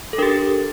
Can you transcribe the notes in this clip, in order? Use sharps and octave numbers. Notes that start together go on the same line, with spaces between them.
A4
D4 G4 A#4